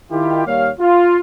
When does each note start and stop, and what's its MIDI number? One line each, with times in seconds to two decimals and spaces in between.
0.11 0.45 51
0.11 0.45 64
0.11 0.45 65
0.11 0.45 67
0.46 0.70 39
0.46 0.70 55
0.46 0.70 58
0.46 0.70 73
0.46 0.70 77
0.80 1.20 65